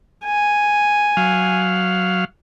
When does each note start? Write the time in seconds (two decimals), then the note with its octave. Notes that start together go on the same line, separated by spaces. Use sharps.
0.24 G#5
1.17 F#3 F5